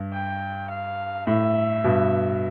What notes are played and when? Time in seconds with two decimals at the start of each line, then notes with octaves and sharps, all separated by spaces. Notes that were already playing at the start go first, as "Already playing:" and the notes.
Already playing: G2
0.13 G5
0.70 F5
1.27 A2 E5
1.84 G2 B2